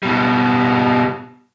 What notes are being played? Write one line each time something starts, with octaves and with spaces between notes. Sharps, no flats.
B2 G3